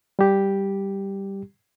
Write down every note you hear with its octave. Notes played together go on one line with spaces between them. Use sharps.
G3 G4